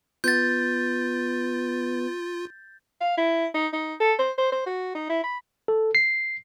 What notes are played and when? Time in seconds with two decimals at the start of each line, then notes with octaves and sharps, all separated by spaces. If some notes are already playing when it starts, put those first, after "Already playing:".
0.24 B3 F4 G6 A6
3.01 F5
3.18 E4
3.54 D#4
3.73 D#4
4.00 A4
4.19 C5
4.38 C5
4.52 C5
4.66 F#4
4.95 D#4
5.09 E4
5.24 B5
5.68 A4
5.95 C7